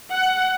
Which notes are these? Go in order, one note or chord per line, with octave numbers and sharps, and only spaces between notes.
F#5